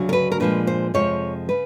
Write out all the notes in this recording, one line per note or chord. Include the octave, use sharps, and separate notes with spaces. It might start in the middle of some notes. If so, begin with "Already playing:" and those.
Already playing: D2 C#3 F#3
A#4
B4
A#4
A#2 F3 G#3 B4
C5
F2 C3 F3 G#3 C#5
C#3 B4